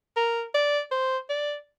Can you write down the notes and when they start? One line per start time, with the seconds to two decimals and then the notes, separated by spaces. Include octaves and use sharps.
0.17 A#4
0.54 D5
0.91 C5
1.30 D5